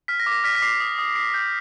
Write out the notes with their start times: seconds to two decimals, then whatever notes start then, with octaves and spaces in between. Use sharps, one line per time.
0.08 F6 B6
0.20 A#6
0.26 D6
0.32 A#6
0.44 F6 B6
0.55 B6
0.62 D6 C7
0.80 D#6
0.98 D#6
1.16 D#6 C7
1.34 G6